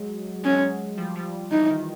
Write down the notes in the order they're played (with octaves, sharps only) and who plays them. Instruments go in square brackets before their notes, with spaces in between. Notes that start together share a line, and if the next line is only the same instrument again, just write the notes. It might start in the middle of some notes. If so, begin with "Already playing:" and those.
Already playing: [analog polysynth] F#3 G#3
[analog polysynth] F#3 G#3 [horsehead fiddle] C#4
[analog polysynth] F3 G3
F3 G3
[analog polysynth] E3 [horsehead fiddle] D#4
[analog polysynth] D#3